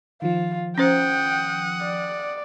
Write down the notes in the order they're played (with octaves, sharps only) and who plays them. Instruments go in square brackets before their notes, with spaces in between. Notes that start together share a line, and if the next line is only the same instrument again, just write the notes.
[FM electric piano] D#3 F3 [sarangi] F4
[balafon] C#4 C5 [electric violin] F#5 D#6 [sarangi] G5
[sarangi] D5